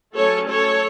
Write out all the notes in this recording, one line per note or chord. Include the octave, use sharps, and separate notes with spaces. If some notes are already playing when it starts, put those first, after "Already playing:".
F#3 A3 C#4 A4 C#5
A4 C#5